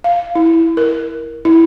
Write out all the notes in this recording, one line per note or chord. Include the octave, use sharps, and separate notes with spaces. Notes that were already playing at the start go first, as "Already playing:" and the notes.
F5
E4
A#4
E4